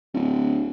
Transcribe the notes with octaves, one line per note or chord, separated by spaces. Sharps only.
D1